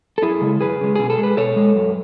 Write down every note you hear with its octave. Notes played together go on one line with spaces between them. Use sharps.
A4
F#2 E4 G#4
C#3 G#3
F#2 G#4 B4
C#3 G#3
B2 G#4
A4
G#3
B4
B2 A4 C#5
G#3
F#2